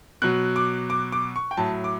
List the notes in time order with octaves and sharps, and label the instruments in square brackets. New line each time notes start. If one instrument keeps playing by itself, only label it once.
[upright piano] B2 F#3 F#6
D6
D6
D6
C#6
G5
A2 F#3 A5
D6